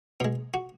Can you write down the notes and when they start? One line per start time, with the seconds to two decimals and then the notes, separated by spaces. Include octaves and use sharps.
0.20 B2 G#3
0.54 F#4